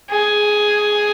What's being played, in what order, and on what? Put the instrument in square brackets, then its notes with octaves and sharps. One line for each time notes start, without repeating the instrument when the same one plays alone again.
[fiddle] G#4